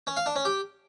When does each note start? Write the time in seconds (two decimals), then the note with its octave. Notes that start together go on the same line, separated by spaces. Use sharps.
0.07 C#4
0.17 F5
0.26 D4
0.36 C#4
0.45 G4